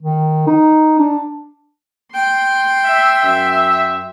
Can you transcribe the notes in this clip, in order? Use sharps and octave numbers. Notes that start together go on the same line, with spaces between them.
D#3
D#4
D4
G5 C6
E5
F#2 E5